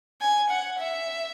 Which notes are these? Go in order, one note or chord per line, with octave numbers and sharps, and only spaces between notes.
G#5
F#5
E5